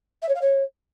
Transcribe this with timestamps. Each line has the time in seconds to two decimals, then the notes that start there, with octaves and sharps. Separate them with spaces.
0.22 E5
0.29 C#5
0.35 F5
0.41 C#5